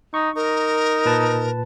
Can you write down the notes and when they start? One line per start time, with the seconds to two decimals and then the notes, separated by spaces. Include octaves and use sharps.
0.14 D#4 C#6
0.36 D#4 A#4
1.06 A#2 B4 A5